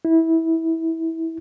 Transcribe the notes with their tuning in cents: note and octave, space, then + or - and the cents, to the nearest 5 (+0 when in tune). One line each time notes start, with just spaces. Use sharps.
E4 -20